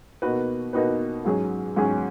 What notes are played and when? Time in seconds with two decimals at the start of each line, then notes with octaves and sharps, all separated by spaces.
0.22 B2 A#3 D#4 F#4 B4
0.73 B2 A#3 D#4 F#4 B4
1.24 G#2 F#3 C#4 G#4
1.76 G#2 F#3 C#4 G#4